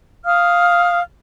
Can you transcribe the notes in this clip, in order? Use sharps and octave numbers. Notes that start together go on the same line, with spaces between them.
F5 D#6 F6